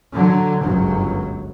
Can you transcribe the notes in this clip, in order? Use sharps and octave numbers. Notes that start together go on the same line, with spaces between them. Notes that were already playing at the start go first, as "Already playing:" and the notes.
D3 F#3
G1 C#2 F#2 F#3